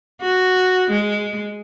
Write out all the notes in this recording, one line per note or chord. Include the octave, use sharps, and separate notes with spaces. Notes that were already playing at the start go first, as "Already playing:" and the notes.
F#4
G#3